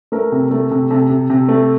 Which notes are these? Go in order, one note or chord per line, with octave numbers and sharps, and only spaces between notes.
A3 A#4
C3
A3
C3
C3 A4
C3
C3
A3